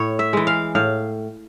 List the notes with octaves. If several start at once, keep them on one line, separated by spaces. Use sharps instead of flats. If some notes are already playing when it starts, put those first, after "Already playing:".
Already playing: A2 C#5
E5
E3 G#3
F5
A2 F5